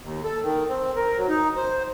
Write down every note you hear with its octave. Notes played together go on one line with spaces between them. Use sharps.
D#2
A4
D#3
C4
A#4
F#3
D#4
C5